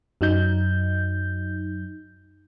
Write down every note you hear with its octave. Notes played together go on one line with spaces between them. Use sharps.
F#2 F#3 D#4 G6